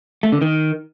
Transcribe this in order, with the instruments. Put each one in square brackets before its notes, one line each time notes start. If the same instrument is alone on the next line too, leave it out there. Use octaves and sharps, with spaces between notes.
[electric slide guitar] A3
D3
D#3